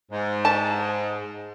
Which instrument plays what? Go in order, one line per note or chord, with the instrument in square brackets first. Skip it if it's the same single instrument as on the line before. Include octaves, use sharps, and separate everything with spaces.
[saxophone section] G#2
[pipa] A5